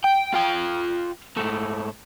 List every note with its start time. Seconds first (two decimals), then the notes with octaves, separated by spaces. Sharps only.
0.04 G5
0.34 F4 G5
1.37 G#2 A3